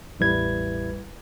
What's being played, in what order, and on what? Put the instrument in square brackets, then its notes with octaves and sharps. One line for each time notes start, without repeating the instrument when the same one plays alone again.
[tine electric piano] A1 E2 G3 E4 B4 G#6